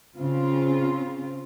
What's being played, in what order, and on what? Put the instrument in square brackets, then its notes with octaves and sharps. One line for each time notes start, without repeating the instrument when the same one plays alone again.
[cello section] C#3 C4 F4